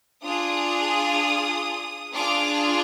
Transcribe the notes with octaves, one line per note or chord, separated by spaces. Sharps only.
D4 F4 G#4 D#6
D4 F4 G#4 D6